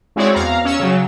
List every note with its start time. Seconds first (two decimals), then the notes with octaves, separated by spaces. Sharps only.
0.16 G#3 C4 E4 F#4 C#5 D5
0.35 E2 F5 A#5
0.65 C#4 C#5 E6
0.80 C#3 F#3